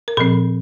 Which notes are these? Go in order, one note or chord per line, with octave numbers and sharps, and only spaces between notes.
A#4
A#2 F3 C4 A4